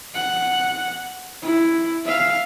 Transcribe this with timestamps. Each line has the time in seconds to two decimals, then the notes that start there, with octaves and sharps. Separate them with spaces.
0.15 F#5
1.43 E4
2.05 E5 F5